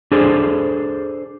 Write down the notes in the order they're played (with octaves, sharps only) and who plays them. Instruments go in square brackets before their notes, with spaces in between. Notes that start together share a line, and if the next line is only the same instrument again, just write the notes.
[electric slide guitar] D4 G#4 A4 C5